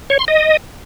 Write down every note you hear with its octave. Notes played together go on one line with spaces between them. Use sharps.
C#5
C6
D#5